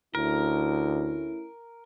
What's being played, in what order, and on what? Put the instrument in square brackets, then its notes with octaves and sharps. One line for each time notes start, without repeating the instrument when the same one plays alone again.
[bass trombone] D2 [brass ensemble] A3 C#4 E4 [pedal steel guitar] A#4